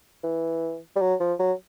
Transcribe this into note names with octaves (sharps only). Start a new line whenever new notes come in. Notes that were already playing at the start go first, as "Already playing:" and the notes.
E3
G3
F#3
F3
F#3